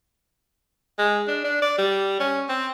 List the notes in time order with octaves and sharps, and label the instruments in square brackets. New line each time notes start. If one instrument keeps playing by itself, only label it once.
[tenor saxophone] G#3
D4
D4
D5
G3
C#4
C4